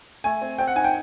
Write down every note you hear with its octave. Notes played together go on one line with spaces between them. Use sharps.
A3 G#5
C4
C4 G5
F#5
D#4 G#5
G5